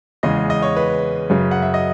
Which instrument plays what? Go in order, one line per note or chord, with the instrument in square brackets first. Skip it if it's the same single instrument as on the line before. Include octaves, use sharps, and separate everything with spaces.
[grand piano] E2 C#3 G#3 D#5
D#5
C#5
B4
F#2 C#3 F#3
F#5
E5
D#5